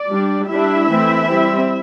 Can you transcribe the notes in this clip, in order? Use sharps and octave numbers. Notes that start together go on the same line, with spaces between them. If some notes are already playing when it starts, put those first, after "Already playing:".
Already playing: D5
G3 D4
G3 D4 E4 E5
E3 A3 C4
G3 C4